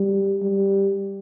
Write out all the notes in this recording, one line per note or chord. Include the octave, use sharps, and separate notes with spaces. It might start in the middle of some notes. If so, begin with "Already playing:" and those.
Already playing: G3
G3